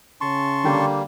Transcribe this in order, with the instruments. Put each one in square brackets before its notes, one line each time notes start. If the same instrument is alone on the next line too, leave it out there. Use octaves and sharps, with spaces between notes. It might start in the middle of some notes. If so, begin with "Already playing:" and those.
[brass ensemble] C#3 C#4 [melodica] A5 C6 C#6
[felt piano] D3 G5 [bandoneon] G3 A#3